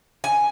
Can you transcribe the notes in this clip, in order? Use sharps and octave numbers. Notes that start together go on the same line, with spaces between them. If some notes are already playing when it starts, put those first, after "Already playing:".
G#5